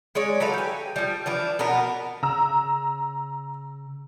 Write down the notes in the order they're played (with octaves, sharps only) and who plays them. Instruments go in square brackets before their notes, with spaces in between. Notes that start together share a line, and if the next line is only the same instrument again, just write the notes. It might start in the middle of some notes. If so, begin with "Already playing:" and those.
[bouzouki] G#3 C#5 D5
F#3 A4 B4 F5
G4 G#5
F3 G3
E3 F3 D4
B2 B3 D4 A#4
[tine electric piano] C#3 [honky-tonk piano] A#5 E6